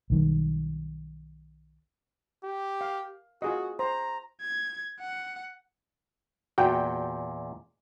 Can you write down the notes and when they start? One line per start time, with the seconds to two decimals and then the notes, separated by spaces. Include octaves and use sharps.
0.10 B1 D#3 G3
2.44 G4
2.81 F5
3.42 F4 F#4 G#4 D#5
3.79 C5 A#5
4.41 G#6
5.00 F#5
6.58 E2 A#2 F#4 G5